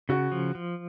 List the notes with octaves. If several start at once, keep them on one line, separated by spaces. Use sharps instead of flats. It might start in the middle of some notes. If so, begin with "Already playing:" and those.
C#3 F#4
F3
F3